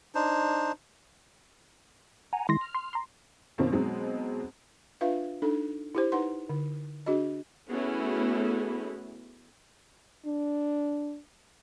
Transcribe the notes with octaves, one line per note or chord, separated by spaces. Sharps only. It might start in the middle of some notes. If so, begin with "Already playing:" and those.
D4 D#4 C5
F#5 G#5 A#5
D#3 G#3 E4 C6 A#6
F6
C6
A#5 C6
B2 D#3 F3 A#3 C4 C#4
B2 F#3 G#3 C4 D#4
D4 F4 B4 E5 F5
D4 D#4 A4
E4 G4 C5
D#4 B4 F#5 C6
D3
D4 F#4 G#4 D#5
A3 B3 C#4 E4 F#4 G#4
D4